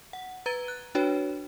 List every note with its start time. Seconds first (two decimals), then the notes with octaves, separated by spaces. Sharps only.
0.13 F#5
0.46 B4 A#5 G#6 A6 D#7 G7
0.68 F#6
0.95 D4 F#4 B4 C#5 G5